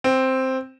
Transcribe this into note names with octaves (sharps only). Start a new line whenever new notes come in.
C4